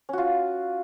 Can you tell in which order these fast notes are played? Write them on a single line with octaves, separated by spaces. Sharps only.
C#4 F#4 F4